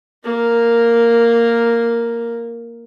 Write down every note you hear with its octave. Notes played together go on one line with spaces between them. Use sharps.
A#3 A#4